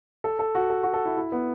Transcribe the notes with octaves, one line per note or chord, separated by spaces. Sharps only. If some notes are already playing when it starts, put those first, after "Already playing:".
A4
A4
F#4
A4
F#4
A4
E4
E4
B3